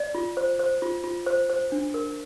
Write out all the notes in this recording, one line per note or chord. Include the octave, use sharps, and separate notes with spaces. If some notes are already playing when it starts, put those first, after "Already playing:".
Already playing: D5
F4
C5
C5
F4
F4
C5
C5
D4
A#4